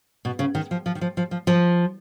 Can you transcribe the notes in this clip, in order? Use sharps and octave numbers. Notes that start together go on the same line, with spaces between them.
B2
C#3
D#3
F3
F3
D#3
F3
F3
F3
F3